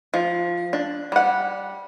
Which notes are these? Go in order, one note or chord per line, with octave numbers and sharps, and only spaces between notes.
F3
D4
G3 F#5